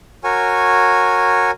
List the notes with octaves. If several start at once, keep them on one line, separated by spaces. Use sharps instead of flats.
F#4 A#4 C#5 G#5